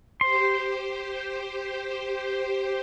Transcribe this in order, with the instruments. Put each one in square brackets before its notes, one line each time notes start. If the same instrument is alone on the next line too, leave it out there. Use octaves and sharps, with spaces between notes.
[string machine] G4 C5 [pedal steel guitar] C6